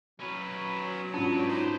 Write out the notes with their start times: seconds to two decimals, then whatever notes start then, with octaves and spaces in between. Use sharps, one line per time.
0.20 F#3 C#4 B4
1.14 G#2 B3 C#4 D4 F4 A5
1.34 B4 D5
1.48 D#4 B4 C5